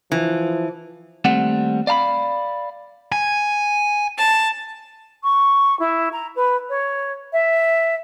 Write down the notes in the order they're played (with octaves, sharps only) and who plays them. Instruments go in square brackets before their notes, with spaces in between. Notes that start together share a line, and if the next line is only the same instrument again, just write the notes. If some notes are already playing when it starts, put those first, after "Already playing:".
[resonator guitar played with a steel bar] E3 [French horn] F3
[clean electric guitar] D#2 G3 A3 C4 F#5
D5 F5 A#5 B5
[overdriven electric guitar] G#5
[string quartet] A5
[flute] C#6
E4
A#5
B4
C#5
E5